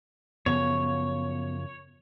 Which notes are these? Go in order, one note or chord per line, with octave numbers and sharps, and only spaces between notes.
F#2 C#3 F3 B3 C#5